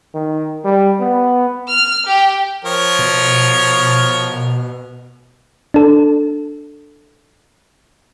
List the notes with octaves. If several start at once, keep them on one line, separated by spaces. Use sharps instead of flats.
D#3
G3
B3
F6
G4
F3 A#4 C#5
B2
D4 A4